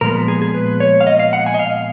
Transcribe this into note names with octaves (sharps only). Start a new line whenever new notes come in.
A#2 F3 G#3 B3 A#4
G#4
G#4
B4
C#5
F5
D#5
F5
F#5
G#5
D#5
F5